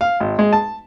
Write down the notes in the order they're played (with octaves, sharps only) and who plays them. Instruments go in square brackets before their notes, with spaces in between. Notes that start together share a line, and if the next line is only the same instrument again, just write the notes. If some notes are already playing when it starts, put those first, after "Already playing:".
[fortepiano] F5
G#1
G#3
A5